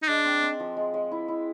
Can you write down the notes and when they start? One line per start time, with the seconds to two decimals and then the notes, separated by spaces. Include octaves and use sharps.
0.03 D#4
0.08 G#3 D4
0.25 C4
0.42 C4
0.60 F3
0.77 G#3
0.94 G#3
1.12 E4
1.28 E4